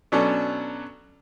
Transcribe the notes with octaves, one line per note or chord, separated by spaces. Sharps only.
B2 F#3 C#4 D4 A4 D5